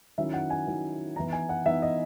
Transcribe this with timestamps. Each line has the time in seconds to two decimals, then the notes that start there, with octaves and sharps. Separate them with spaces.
0.18 D#3 F#3 C#4 E4 E5
0.34 F#5
0.50 G#5
0.67 D#3 F#3 C#4 E4
1.16 E3 B3 D#4 A#5
1.32 G#5
1.49 F#5
1.66 E3 B3 D#4 E5
1.82 D#5